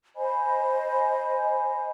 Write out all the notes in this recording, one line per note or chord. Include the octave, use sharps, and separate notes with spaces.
C5 D#5 G#5 B5